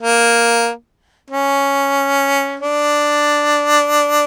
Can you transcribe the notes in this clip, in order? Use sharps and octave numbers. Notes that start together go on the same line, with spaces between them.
A#3
C#4
D4